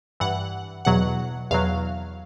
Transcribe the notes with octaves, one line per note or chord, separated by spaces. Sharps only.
G2 E3 F#5
E2 B2 F#3 F#5
E2 B2 F#3 F5